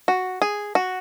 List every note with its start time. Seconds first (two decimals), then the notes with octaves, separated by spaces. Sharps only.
0.08 F#4
0.42 G#4
0.75 F#4